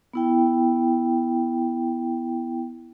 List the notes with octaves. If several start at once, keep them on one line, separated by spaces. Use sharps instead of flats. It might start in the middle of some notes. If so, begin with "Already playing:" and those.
B3 E4 G5